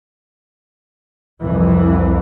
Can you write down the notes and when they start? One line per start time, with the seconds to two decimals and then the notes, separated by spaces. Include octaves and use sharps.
1.42 C2 F2 E3